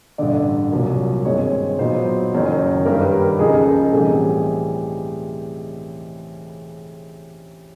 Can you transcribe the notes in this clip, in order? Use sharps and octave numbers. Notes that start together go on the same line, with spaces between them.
A1 G2 D3 D5
C2 A#2 F#3 A#3
G2 D#3 G#3 C4 C#5
A#2 F#3 B3 D#4 C5
F#1 F#2 D#3
G2 D#3 G3 A#3 A#4
B4
A#4
C#2 C#3 F3 A#3 D#4 G#4
A4
G#4
A4
A2 E3 G3 C4 D#4 G#4